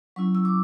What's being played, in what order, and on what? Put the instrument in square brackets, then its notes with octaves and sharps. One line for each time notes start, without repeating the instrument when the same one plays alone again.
[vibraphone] F#3 C#4 E4 C#6
E6
D6